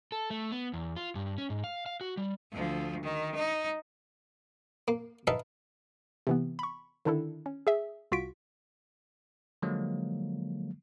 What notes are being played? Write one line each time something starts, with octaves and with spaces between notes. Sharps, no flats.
A4
A3
B3
E2
F4
G2
C#4
G#2
F5
F5
F#4
G3
D2 F3
D#3
D#4
A#3
D#4 E4 B4 E5 F5 A5
C3 E3 B3
B5 C#6
D3 D#3 D4 E4 A4
C#4
G#4 E5
C2 F4 F#4 C#6 B6 D7
D3 F3 F#3 G#3 A#3